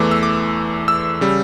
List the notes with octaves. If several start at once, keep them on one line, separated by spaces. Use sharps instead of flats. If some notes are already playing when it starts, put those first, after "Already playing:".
Already playing: E2 E3 A3 D6
E6
D6
E6
C#3 G3